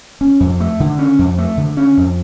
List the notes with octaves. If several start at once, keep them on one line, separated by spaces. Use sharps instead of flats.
C#4
F2
A3
D3
C#4
F2
A3
D3
C#4
F2